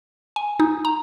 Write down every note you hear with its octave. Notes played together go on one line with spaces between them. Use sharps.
G#5
D#4
A#5